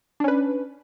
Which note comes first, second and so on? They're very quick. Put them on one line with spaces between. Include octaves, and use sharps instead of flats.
D4 C#4 B4